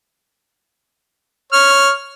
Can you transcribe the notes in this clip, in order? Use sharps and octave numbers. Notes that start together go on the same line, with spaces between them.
C#5 F6